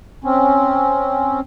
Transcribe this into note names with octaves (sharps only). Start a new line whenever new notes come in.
C4 C#4